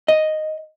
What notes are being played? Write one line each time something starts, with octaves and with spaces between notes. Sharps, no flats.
D#5